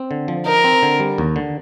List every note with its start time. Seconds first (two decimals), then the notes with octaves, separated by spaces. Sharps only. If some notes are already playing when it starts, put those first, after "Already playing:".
Already playing: C4
0.11 D3
0.28 F3
0.46 D#4 A#4
0.64 C4
0.83 D3
1.00 G3
1.18 D#2
1.36 D3